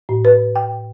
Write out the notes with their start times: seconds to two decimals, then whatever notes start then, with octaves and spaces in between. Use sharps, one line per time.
0.09 A2
0.25 B4
0.56 G5